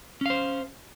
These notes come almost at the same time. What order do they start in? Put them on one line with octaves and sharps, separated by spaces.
C#4 F5 C5